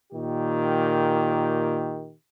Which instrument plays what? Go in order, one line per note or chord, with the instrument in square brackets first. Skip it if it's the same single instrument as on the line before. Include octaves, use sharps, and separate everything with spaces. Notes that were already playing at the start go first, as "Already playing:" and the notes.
[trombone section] A#2 D#3 G4